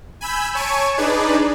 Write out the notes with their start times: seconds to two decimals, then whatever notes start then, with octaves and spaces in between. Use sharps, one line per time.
0.21 G#5 B5 E6 G6
0.55 C#5 G#5 A5 C#6 D7 D#7
0.97 D4 D#4 G#4 B4 D5